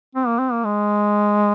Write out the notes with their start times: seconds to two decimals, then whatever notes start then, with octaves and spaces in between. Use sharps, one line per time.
0.15 C4
0.27 A#3
0.39 C4
0.52 A#3
0.64 G#3